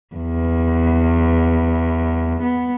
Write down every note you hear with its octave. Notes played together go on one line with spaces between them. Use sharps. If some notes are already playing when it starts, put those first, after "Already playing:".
E2
B3